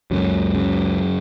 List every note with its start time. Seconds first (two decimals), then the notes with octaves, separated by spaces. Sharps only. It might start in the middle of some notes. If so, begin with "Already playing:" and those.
0.11 C#2 F#2 F#3
0.55 C#3